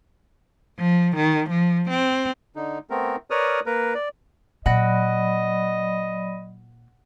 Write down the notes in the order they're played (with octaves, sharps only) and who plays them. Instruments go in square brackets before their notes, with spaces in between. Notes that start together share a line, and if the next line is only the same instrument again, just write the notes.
[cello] F3
D#3
F3
C4
[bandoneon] D3 D#4
A3 B3 C4 A#4
A#4 B4 C#5 D5 D#6 F6
A#3 A#4 B4
D5
[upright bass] A#2 [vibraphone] F#3 D5 B5 [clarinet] D#5 [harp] F#5